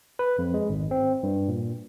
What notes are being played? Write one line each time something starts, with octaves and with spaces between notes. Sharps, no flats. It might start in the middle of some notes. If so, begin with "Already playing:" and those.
B4
F2
G#3
G#1
C4
G2
A#2